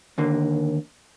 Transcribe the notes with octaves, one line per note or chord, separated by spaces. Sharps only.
D#2 D3 A#3